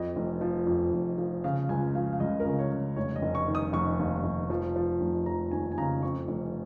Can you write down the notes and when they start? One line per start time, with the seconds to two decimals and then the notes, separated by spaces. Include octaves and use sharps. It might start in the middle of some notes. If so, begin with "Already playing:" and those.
Already playing: F2 D#5
0.16 F1
0.41 F3
0.67 F2
0.93 F1
1.18 F3
1.44 C#3 F5
1.69 C#2 G#5
1.95 F3 F5
2.13 F5
2.20 C#2 D#5
2.40 A#4
2.46 C#3
2.59 C#5
2.72 C#3
2.96 F1 C#5
3.16 D#5
3.22 F1
3.35 C#6
3.48 D#3
3.55 D#6
3.73 F1 C#6
3.99 D#2
4.24 F1
4.50 F3
4.76 F3
5.01 F1
5.26 F3 A#5
5.51 D#2 G#5
5.72 G#5
5.78 C#3 A#5
6.03 F2 C#6
6.28 F1